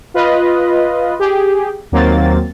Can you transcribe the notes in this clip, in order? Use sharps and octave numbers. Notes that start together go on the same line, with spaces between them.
F4 B4 D#5
G4 G#4
D#2 F#3 A#3 C4 A6